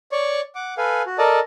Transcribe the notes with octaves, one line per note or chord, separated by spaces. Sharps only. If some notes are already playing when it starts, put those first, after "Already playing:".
C#5 D5 C#6
F#5 D6
A4 B4 F5 G#5
F#4
A4 A#4 D5 D#5 A5